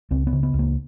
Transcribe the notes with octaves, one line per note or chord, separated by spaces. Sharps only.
C#2 C4
B3
C#3
B3
C#2
A#3